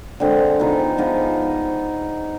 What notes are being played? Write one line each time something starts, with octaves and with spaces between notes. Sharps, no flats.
D3 G#3 C4
F3 B3 D#4 G#4
F3 B3 D#4 G#4